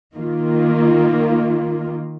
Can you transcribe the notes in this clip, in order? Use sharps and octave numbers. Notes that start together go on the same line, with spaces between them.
D#3 A#3 F4